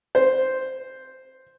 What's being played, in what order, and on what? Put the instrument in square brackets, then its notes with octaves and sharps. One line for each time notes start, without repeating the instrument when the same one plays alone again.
[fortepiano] C5